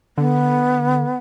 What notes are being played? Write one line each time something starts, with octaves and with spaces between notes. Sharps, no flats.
D3 B3